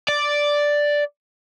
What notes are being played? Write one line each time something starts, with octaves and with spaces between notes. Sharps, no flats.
D5